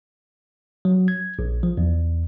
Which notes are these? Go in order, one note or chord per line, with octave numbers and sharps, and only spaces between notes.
F#3
G#6
A#1
F3
E2